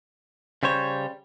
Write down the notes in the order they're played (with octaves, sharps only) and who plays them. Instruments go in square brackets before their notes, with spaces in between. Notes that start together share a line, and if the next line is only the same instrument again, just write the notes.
[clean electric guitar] C#3 G3 C5 C#5